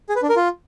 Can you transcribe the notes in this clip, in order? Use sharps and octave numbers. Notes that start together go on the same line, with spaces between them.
G#4
B4
D4
A#4
F4